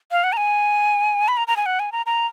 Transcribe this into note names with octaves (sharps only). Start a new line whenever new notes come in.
F5
F#5
A#5
G#5
B5
A#5
A#5
G#5
F#5
G#5
A#5
A#5